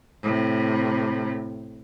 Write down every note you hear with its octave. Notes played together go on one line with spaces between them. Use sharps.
A2 C3